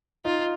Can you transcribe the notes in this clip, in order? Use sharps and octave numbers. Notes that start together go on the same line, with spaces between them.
D#4 F4